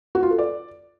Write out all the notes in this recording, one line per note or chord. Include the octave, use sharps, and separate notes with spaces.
F#4
F4
A4
D5